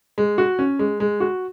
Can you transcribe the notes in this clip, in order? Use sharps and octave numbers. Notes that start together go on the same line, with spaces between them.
G#3
F#4
C#4
G#3
G#3
F#4